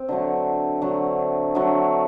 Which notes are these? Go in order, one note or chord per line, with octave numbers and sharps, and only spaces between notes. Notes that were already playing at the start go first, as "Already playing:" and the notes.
Already playing: C4
D3 F#3 A3
D3 F#3 A3
D3 F#3 A3